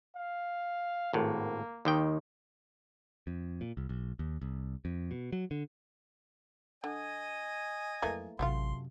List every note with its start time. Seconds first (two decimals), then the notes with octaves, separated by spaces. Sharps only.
0.16 F5
1.13 G#1 A2 A#3
1.85 D#2 D#3 G5
3.27 F2
3.61 A#2
3.77 C2
3.89 B1
4.19 D#2
4.42 C2
4.85 F2
5.11 B2
5.32 F#3
5.51 D3
6.84 D3 D#5 G#5
8.02 F2 E3 F#3 A3 A#3
8.39 A1 F#2 C3 F#3 A3 F4 C6